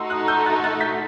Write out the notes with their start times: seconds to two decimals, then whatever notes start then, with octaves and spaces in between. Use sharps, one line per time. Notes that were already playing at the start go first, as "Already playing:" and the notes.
Already playing: A3 D#4 F#4 C6 E6
0.10 D#6 F#6
0.28 E6 G6
0.46 F#6 A6
0.64 F#6 A6
0.81 G6 B6